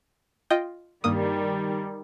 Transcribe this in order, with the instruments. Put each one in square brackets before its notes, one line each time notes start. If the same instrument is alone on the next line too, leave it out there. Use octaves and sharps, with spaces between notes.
[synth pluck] F4 D#5 G5
[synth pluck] G2 A#3 D#6 [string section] D#3 G3